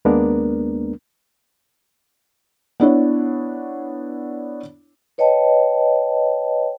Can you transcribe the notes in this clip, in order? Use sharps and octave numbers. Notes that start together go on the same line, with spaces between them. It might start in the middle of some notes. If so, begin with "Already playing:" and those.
D#2 G#3 A#3 B3 D4 A#4
B3 D4 E4 C#5
B4 C#5 D#5 G5 A5